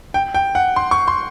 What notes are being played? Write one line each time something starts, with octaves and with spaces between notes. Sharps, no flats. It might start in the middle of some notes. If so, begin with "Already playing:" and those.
G5
G5
F#5
C6
C#6
C6